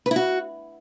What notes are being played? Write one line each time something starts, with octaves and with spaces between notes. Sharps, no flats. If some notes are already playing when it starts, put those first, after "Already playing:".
B4
E4
F#4